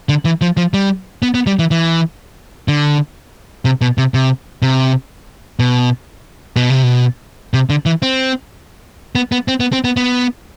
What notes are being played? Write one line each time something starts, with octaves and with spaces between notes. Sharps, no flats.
D3
E3
F3
F3
G3
B3
B3
G3
E3
E3
D3
C3
B2
C3
C3
C3
B2
B2
C3
B2
C3
D3
E3
C4
B3
B3
C4
B3
C4
B3
B3